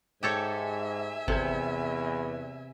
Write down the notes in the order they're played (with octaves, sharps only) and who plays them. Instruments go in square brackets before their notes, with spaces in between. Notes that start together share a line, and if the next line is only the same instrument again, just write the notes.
[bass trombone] G#2 [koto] G4 A4 C#5 [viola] E5 G#5
[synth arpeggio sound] G#1 A4 G#6 [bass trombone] E2 [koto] C3